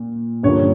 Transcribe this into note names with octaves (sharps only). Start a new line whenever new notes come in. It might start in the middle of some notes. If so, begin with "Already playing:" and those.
Already playing: A#2
G2 D3 F3 A#3 C#5